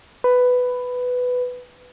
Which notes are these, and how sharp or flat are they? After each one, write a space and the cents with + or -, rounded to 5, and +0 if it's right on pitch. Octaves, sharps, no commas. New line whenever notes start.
B4 +10